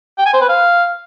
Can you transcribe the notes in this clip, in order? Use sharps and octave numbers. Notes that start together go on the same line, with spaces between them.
G5
G#5
C5
B4
F5